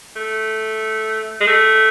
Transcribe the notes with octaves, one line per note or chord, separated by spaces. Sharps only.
A3
G#3
A3